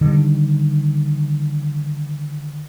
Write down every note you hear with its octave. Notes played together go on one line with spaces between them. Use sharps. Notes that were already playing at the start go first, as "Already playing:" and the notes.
D3 D#3 G3